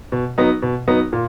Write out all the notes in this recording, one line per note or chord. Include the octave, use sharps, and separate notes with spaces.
B2
F#3 B3 D#4
B2
F#3 B3 D#4
A#2